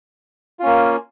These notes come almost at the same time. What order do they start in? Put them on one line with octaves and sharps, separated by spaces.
F4 C#4 A#3